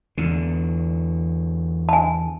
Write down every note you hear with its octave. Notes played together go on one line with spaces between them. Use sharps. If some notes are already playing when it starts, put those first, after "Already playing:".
E2 D3
G#5 A5